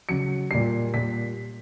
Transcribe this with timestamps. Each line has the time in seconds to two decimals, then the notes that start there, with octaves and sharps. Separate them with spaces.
0.09 C#3 F#3 C#7
0.51 A#2 G3 C7
0.94 A#2 G3 B6